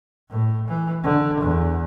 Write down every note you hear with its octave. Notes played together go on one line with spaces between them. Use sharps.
A2
E3
D3
E2